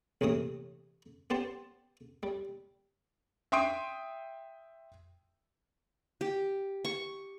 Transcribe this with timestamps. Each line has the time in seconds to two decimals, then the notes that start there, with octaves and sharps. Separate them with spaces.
0.21 A#1 E2 A2 C3 D#6
1.30 B3 G4 C5 A5
2.23 G3
3.52 E5 G5 C6 D#6 D7
6.21 G4
6.85 C#6